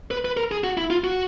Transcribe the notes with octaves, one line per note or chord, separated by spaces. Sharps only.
B4
B4
A#4
G#4
F#4
E4
F4
F#4